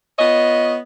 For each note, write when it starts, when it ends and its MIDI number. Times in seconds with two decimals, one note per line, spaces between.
0.18 0.77 59
0.18 0.77 65
0.18 0.77 73
0.18 0.77 75